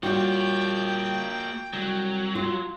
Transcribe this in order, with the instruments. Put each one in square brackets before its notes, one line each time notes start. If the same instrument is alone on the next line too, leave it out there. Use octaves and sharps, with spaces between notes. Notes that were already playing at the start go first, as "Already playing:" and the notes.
[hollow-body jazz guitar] A#2 G3 [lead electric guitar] A#3 C#5 [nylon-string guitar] F4 F#4 [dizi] G5
[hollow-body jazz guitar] C2 [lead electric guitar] F#3
[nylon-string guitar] F4